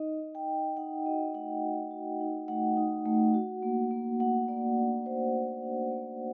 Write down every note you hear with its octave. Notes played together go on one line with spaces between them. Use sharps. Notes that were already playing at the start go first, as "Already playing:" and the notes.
Already playing: D#4 D#5
D#4
G5
D#4
D#4 F#5
F#4 D#5
A3 F#5
F#4
F#4
D#4
A3 F#5
D#4
A3
F#4
A#3
A#3
A#3 F#5
A#3 D5
D4 D5
A#3 C5
A#3
D4
A#3